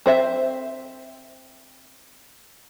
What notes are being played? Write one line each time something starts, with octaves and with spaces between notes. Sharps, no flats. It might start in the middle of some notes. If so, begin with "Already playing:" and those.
C4 C5 E5